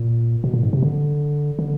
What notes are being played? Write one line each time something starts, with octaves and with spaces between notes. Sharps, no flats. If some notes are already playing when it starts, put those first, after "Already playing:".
Already playing: A#2
B2
A#2
G#2
C3
D3
D3